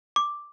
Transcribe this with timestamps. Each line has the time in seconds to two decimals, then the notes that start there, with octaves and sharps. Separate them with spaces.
0.16 D6